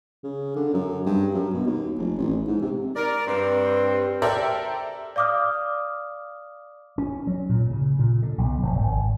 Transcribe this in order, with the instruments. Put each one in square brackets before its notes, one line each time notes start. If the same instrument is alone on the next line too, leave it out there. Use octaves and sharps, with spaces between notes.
[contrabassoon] C#3
D3
F#2
G2
F#2
B2
D#2
F1
A1
G#2
C3
[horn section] A#4 D5
G2 C4
[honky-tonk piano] G4 A4 A#4 C5 D5 E5
[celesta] D5 F5 D6 D#6 F6
[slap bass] C#4
F#3
A#2
C#3
A#2
D3
B1
F1
G#1